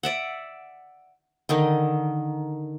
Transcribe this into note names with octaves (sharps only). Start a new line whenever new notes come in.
D5 E5 F#5
D3 D#3 D#4